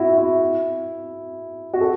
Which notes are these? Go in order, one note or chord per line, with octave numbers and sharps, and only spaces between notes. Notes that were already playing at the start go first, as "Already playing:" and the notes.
Already playing: E4 F#4
E4
F#4
A4